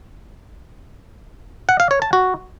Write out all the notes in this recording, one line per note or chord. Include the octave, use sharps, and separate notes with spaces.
F#5
F5
C#5
A5
F#4